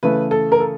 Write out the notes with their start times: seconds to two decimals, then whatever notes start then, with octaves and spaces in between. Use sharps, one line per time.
0.03 C#3 E3 A3 B4
0.31 A4
0.52 A#4
0.60 A4